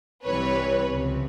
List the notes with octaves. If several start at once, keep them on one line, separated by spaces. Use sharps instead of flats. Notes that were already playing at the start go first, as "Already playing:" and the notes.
C2 C3 E3 G3 B4 C#5
C#2 C3 F3